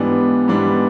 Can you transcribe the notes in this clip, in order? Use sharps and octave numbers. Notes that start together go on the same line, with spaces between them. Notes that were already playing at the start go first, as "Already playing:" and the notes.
Already playing: G#2 E3 G3 B3 D4
G#2 E3 G3 B3 D4